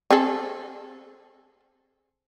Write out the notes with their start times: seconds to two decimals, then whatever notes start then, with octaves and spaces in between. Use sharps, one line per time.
0.11 C4 G#4 A4